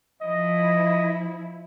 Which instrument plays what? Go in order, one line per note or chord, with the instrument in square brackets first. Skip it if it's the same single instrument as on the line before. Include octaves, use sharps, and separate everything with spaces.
[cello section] F3 E4 [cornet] D#5